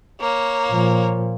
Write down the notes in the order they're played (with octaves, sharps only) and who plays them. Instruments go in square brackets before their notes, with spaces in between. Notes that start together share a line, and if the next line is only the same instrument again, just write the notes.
[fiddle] A#3 C#5
[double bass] A#2 F3